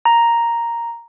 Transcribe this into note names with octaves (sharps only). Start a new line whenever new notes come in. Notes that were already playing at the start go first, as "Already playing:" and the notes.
A#5